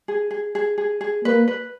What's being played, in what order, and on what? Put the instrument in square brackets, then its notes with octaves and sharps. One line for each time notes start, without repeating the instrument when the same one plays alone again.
[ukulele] G#4
G#4
G#4
G#4
G#4
[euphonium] A#3 [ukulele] B4
[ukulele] B4